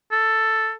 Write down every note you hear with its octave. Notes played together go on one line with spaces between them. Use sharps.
A4